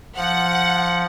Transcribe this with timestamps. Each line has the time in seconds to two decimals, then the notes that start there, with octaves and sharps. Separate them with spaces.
0.17 F3 F#5